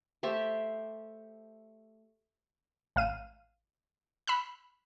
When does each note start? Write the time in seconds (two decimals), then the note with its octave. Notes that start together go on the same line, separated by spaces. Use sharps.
0.23 A3 G4 C5 E5
2.96 A1 F5 D#7
4.27 B5 E6 F#6